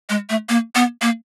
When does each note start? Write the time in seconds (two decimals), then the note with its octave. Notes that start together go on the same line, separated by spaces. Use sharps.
0.10 G#3
0.30 A3
0.49 A#3
0.75 B3
1.01 A#3